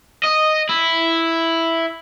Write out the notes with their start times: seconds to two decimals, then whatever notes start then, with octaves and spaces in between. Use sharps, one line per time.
0.24 D#5
0.69 E4